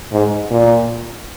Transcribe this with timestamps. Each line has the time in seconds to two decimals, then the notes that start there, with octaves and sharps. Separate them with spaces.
0.12 G#2
0.51 A#2